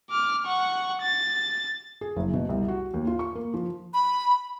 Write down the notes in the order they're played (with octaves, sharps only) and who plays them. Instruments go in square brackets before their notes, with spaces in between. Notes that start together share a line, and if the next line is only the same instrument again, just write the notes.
[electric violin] D6 F6
F#5 C#6
A6
[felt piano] G#4
F#1
B2
C2
F#4
D#2
F4
C#6
A#3
F3
[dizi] B5